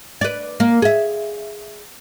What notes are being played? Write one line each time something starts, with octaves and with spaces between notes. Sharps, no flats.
B4 D5
A#3
G#4 E5